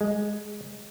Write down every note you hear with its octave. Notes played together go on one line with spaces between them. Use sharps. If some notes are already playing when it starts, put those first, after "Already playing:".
G#3